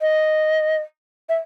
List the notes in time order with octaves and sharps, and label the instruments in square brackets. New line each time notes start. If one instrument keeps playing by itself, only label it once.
[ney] D#5
E5